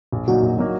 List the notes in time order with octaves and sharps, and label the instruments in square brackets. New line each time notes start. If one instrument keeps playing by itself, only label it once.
[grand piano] A#1
[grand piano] A#2 F#3 A#3 D#4 [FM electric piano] F#4
[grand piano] A#1
A#2 F#3 A#3 D#4